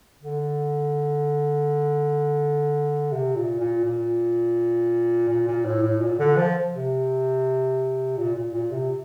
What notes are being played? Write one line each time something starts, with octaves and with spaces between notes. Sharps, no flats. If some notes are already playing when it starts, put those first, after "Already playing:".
D3
C3
A#2
A#2
A#2
A#2
A#2
A2
A2
A#2
D3
F3
C3
A#2
A#2
A#2
C3